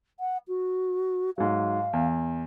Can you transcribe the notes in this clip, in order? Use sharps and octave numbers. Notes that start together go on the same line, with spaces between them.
F#5
F#4
G#2 F#3 F5
E2